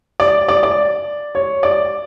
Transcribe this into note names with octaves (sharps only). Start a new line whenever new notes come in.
D5
D5
D5
C#5
D5